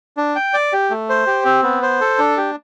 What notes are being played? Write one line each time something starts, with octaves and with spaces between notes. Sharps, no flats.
D4
G5
D5
G4
A3
C5
G4
C4
B3
C5
A4
D4
G4